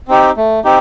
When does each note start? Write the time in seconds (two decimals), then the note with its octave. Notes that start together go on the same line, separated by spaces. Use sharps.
0.08 C4 D#4 G4
0.37 A3
0.64 C4 D#4 G4